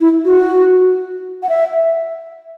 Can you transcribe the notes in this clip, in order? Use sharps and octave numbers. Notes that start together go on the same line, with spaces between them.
E4
F#4
F#5
E5